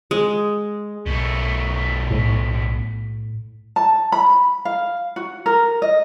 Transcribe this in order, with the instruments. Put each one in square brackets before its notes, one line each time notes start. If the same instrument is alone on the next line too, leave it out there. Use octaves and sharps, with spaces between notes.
[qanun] G#3
[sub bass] B1 [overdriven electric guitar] B2 A3
[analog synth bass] A2
[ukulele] A5
B5
F5
F#4
A#4
D#5